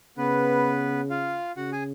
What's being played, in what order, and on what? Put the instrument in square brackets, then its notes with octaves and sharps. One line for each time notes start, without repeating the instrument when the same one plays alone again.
[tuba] C#3 [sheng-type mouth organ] B3 B4
[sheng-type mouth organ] F4 F5
[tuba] C#3 [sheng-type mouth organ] F#4 F#5
[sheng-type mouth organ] G#4 G#5